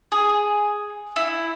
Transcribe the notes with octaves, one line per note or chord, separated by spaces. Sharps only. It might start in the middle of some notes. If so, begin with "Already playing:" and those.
G#4
E4